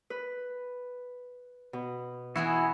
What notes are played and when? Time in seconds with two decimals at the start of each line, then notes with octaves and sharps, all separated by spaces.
0.10 B4
1.73 B2
2.36 E3 B3 E4 F#4 G#4